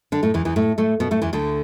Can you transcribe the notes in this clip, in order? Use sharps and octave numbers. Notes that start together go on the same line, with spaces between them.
D3 D4
A2 A3
E2 E3
E2 E3
A2 A3
A2 A3
B2 B3
A2 A3
E2 E3
D2 D3